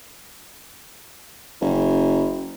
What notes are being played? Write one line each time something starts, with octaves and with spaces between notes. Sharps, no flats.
F#1